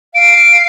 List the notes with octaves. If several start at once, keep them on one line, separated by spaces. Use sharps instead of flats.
F5 D7